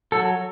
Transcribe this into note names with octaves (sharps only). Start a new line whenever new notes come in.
F#3 A4